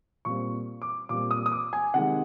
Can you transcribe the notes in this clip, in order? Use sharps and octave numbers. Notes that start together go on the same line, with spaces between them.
A#2 G3 C4 C#6
D6
A#2 G3 C4 D6
D#6
D#6
D6
G#5
C3 D#3 G#3 F#5